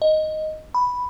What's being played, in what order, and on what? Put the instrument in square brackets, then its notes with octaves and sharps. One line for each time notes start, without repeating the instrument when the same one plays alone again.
[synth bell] D#5
B5